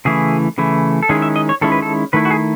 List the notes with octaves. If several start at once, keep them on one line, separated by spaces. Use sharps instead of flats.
C#3 E3 A3 E4 G#4
C#3 E3 A3 E4
A4
D#3 G#3 C#4 E4 G#4
E5
D#5
C#5
D#3 G#3 C#4 E4 A4
B4
A4
D#3 A3 E4 B4
F#4
G#4